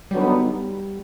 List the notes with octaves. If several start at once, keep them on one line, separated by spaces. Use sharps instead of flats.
D3 F#3 G3 B3 D#4